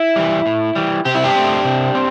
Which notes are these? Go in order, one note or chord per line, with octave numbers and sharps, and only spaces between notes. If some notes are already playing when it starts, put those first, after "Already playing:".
Already playing: E4
E3 G3
A2
E3 G3
C3 G4
E4
D4 G4
A3 C4
C3
C4